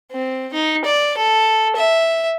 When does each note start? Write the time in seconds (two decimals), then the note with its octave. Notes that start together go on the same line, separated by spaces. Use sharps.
0.12 C4
0.54 D#4
0.85 D5
1.18 A4
1.76 E5